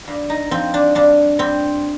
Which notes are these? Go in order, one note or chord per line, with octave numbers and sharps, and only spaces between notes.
G2
D#4
F3 C4
D4
G2 D4
G2 C4